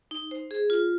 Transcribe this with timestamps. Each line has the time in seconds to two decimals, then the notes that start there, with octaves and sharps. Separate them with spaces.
0.11 D#4
0.31 C5
0.51 G#4
0.70 F4